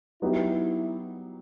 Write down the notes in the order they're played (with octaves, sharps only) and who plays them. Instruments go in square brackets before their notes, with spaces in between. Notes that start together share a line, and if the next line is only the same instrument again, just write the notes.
[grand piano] F#3 B3 D#4 G4 [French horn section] E4